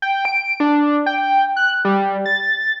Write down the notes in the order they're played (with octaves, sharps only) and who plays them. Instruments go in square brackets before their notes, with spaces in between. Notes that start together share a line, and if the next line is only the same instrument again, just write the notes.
[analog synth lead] G5
D7
D4
G5
F#6
G3
A6